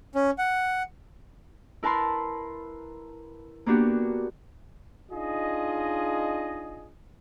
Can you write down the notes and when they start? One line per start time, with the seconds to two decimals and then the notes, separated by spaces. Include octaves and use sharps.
0.15 C#4
0.39 F#5
1.83 E4 A#4 B4 A5 B5 C6
3.66 A#3 B3 D4 F#4 G4
5.11 D4 D#4 F4 G#4 D#5